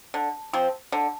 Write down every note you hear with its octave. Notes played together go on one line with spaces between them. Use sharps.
D3
F3 C4
D3